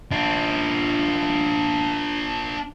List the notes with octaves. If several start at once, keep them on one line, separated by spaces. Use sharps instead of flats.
D4 F4